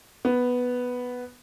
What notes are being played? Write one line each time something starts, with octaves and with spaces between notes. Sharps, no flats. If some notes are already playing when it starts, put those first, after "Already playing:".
B3